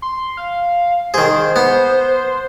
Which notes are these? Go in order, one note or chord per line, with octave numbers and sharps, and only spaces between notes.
C6
F5
D#3 G#4 C5
B3